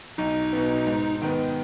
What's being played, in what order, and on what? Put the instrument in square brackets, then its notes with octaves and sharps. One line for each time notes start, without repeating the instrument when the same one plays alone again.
[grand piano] B1 [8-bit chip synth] D#4
[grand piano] B2 B3
G#2
D#3 B3